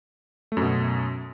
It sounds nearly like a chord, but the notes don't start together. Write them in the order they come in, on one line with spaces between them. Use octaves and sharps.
A3 F#2 B2